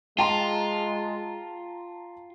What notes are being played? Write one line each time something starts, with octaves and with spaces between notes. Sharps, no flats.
G#3 F4 G5 A5 A#5 C6